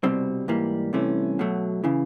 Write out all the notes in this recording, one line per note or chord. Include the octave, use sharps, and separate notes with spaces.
C2 B2 G3 C4
G#2 E3 G3 A#3
C2 C3 E3 A3 C#4
B2 F#3 A3
C#3 E3